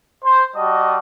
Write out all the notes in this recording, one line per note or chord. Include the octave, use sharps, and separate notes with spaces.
C5
G3 F#4 D#5 A5 D#6